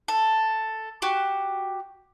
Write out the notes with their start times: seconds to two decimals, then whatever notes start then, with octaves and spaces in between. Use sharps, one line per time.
0.08 A4
1.02 F#4 G4